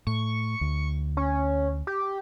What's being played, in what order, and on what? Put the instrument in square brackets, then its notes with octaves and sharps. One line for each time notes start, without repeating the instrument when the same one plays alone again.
[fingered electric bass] A2 [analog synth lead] C#6
[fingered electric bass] D2
[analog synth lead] C#4
G4